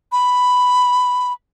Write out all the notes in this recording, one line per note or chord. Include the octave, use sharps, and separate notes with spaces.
B5